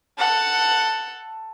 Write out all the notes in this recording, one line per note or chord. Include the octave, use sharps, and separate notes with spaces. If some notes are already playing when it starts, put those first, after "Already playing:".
A4 F#5